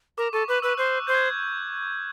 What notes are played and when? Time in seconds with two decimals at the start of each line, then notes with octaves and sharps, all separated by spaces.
0.18 A#4 D6
0.33 A4 C#6
0.48 B4 D6
0.62 B4 E6
0.77 C5 F#6
1.07 C5 G6
1.15 G#6